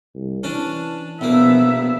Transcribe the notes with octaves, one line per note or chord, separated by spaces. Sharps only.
C2
E3 C#4 D4
A#1 B2 A#3 B3 E5